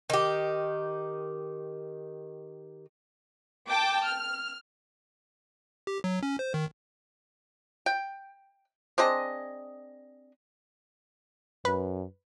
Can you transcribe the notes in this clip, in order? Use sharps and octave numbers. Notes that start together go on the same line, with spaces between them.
D#3 G4
G5 A5 D6
F6
G4
F#3
C#4
C5
D#3
G5
C4 D4 G#4 D#5
F#2 B4